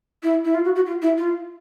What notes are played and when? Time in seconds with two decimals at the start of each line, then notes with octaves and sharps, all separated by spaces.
0.23 E4
0.45 E4
0.55 F4
0.65 F#4
0.75 F#4
0.86 F4
1.02 E4
1.18 F4